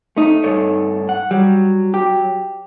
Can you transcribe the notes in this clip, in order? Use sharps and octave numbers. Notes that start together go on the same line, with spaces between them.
A3 D#4
G2 A4 C#5
F#5
F#3 G3
G4